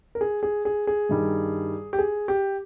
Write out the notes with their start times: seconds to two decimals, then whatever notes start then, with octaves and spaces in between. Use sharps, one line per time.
0.15 A#4
0.21 G#4
0.43 G#4
0.65 G#4
0.87 G#4
1.09 G2 D#3 G3
1.93 G4
1.99 G#4
2.28 G4